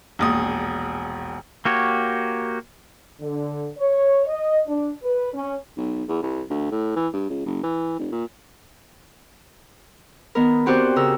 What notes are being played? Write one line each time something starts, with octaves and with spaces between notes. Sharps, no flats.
E1 A#1 D#6
A#3 F#4 G4 C#5
D3
C#5
D#5
D4
B4
C#4
B1
E2
C2
D2
A2
E3
G2
C#2
F#1
E3
F1
A#2
D#3 B3 A#4
C4 F#4 G4 C5 D5 F#6
C#3 A#4 E6